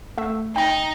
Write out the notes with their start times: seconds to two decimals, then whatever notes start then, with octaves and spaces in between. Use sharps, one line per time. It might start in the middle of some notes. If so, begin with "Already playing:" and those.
0.18 A3 E5
0.56 D#4 G5 A#5